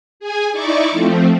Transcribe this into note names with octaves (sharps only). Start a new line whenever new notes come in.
G#4 G#5
D#4 E4 D5 C#6 D6
F3 A3 C4